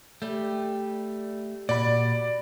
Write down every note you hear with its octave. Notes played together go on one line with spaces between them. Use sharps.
G3 A3 G4
A#2 F#4 D5 B5